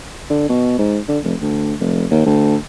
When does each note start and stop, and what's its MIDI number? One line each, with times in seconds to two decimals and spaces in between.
0.30 0.47 50
0.49 0.77 47
0.78 0.99 44
1.08 1.18 50
1.24 1.35 29
1.41 1.73 38
1.80 2.05 29
2.10 2.23 39
2.26 2.56 38